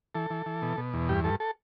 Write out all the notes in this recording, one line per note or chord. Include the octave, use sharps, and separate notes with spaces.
E3 A4
E3
E3
B2
B2
E2
G2 G4
G2 A4
A4